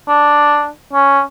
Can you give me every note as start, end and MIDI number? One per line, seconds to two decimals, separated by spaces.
0.08 0.69 62
0.93 1.21 61